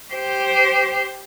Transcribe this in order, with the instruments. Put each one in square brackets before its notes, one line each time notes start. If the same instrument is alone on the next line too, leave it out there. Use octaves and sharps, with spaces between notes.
[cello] G4 C5